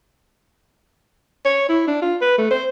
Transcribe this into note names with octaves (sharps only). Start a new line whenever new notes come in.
C#5
E4
D4
F4
B4
A3
C5